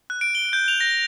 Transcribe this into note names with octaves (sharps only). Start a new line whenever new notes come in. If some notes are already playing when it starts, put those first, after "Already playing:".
F#6
D7
G7
G6
F7
A#6